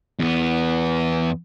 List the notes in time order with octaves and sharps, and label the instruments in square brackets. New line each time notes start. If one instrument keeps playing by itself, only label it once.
[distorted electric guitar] E2 B3